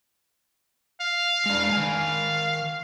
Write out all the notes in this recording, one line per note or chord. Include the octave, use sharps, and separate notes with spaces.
F5
G#3 D4
D#3 G#5
F5